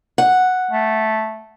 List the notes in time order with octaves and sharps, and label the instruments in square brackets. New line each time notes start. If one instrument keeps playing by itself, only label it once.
[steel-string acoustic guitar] F#5
[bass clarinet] A3